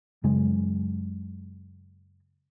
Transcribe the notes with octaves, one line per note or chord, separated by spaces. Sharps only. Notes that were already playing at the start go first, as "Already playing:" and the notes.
F#2 C#3 G#3